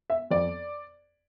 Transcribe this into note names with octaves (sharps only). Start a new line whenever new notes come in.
E5
F2 D5